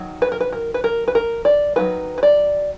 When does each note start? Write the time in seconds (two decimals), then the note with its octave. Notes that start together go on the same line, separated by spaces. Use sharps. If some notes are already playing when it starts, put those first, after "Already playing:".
Already playing: D#3 F#3
0.22 B4
0.32 A#4
0.41 B4
0.53 A#4
0.74 B4
0.84 A#4
1.08 B4
1.15 A#4
1.45 D5
1.76 D#3 F#3 A#3 D#4 B4
2.18 B4
2.23 D5